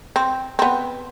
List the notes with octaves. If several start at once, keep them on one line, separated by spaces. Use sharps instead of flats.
C4
B3 C4